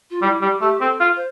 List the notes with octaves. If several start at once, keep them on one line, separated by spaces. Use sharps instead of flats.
F4
G3 E4
G3 G4
A3 G4
C4 A4
F4
C5